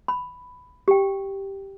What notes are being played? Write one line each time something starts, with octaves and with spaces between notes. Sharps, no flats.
B5
G4 G5